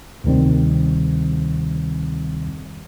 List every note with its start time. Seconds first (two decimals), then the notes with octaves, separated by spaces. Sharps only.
0.24 D2 C3 D#3 G3 C4